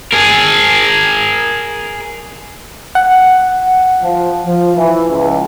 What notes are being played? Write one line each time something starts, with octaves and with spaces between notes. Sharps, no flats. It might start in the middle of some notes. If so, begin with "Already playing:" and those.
G#4 A#4
F#5
F3
F3
E3
C#2